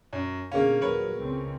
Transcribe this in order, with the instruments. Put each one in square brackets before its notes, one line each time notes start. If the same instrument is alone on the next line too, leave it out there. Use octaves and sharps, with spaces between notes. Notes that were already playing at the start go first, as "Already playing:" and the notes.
[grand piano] F#2
[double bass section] B2 D3 [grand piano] A#3 C#4 [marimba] G#4 F5
[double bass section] D#2 A#2 F#3 [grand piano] A#4 B4 C#5
[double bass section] C#2 C4 C#4